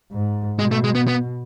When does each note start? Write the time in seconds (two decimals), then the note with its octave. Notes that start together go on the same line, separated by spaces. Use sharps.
0.12 G#2
0.59 B2 G#3
0.71 A3
0.84 G#3
0.95 B3
1.08 B3